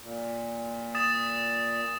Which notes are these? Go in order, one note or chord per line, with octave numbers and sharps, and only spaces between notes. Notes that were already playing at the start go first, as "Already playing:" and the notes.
A#2
D#6 A6 E7